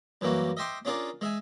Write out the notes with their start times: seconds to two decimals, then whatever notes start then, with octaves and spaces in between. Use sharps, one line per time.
0.21 F#2 E3 G3 A#3 F#4
0.57 D#5 E5 G5 C6 D6
0.85 C#4 D4 F4 G#4 A#4 D5
1.21 G#3 E5 G#5